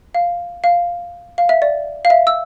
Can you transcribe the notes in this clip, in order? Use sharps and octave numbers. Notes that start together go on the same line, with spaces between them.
F5
F5
F5
E5
D5
F5
E5
E6